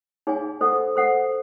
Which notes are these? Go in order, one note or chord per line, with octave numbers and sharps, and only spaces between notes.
D#4 G#4 C#5 F5 G#5
A4 C5 D#5 F#5
A4 C5 D#5 F#5